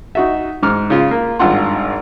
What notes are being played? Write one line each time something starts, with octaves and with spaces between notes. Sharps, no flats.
D#4 F#4 E5
G#2 D6 F6
C#3 F4
A#3
G#1 G2 F4 F#5 C6